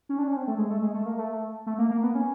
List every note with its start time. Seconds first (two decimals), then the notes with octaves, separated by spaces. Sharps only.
0.09 C#4
0.19 D4
0.28 C#4
0.37 C4
0.47 A3
0.58 G#3
0.70 A3
0.82 G#3
0.94 A3
1.06 A#3
1.18 A3
1.66 A3
1.79 A#3
1.91 A#3
2.03 B3
2.15 C#4